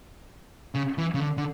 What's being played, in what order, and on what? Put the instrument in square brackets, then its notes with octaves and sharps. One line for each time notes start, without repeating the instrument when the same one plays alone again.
[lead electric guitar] C#3
E3
C#3
D3
D3